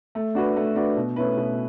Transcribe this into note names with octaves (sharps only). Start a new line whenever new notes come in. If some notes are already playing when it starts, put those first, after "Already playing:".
A3
D4 F#4 B4
A3
D4 F#4 B4
B2
A3 C#4 E4 B4
B2